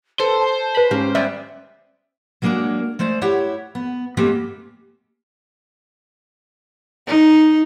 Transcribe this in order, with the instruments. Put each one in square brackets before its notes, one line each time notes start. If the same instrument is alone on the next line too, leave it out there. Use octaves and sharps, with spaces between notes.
[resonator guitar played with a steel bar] A4 [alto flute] B4 [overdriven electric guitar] C5
[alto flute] A5
[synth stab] B4 B5
[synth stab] G#2 [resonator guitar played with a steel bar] A#3 G4 [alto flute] C#4
[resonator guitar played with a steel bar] G3 B3 D5 [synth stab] E5
[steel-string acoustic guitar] F#3 G#3 A#3 C#4 D4 F#4
G#3 A3 C5 D5
E4 G4 C#5 F#5
B3
G#3 A#3 B3 C#4 G4 A4
[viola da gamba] D#4